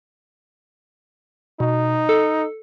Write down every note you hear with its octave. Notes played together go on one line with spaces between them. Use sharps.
B2 D#4
A4